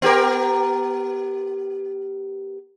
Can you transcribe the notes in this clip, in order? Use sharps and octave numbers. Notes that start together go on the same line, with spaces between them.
B3 G4 A#4